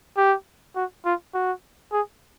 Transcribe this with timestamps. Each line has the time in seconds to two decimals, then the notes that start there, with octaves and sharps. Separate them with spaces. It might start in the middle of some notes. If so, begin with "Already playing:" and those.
0.17 G4
0.76 F#4
1.05 F4
1.34 F#4
1.92 G#4